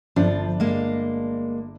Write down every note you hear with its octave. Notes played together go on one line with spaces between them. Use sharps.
G1 F3 D4
G#3 A#3